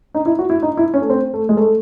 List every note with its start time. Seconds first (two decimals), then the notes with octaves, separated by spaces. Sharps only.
0.14 D#4
0.26 E4
0.39 F#4
0.50 E4
0.62 D#4
0.77 E4
0.94 C#4
1.02 A3
1.10 C4
1.34 A3
1.49 G#3
1.57 A3